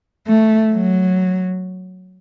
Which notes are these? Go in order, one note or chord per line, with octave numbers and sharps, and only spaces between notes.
A3
F#3